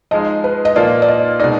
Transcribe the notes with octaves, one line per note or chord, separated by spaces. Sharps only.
F3 G#3 D#4 D#5
B4
D#5
A#2 F3 A#3 F4 D5
D5
D#5
B2 G#3 D#4 D5